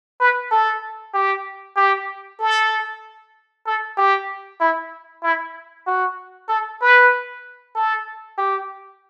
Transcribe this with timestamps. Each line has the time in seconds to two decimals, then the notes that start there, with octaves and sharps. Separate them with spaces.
0.20 B4
0.52 A4
1.14 G4
1.77 G4
2.40 A4
3.66 A4
3.97 G4
4.61 E4
5.23 E4
5.87 F#4
6.49 A4
6.81 B4
7.75 A4
8.38 G4